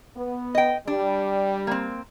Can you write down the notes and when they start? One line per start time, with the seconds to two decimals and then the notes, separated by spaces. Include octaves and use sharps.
0.17 B3
0.55 D#5 G5
0.87 G3 D4
1.67 A#3 C4